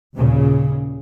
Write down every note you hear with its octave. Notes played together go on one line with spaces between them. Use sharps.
D#2 A#2 C#3